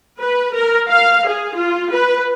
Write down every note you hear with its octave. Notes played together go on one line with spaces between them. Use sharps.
B4
A#4
F5
G#4
F4
B4